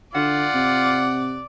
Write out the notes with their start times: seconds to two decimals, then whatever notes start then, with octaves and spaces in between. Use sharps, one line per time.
0.15 D3 F4 D5 F#5
0.55 C3